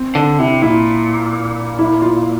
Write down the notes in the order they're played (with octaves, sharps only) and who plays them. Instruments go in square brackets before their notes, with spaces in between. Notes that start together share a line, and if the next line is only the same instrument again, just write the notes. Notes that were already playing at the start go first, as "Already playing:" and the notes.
Already playing: [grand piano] C4
[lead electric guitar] D3 [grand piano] D4
[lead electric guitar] C3 [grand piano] E4
[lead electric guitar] A#2 [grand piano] E4
[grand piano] E4
F4